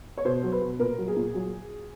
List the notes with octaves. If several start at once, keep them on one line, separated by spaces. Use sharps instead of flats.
C#5
B2 C5
F#3
B4
B2
A#2 A#4
F#3
G#4
A#2
F#3